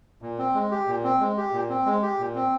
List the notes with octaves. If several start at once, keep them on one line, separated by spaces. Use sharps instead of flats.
A#2
C4
G#3
G4
A#2
C4
G#3
G4
A#2
C4
G#3
G4
A#2
C4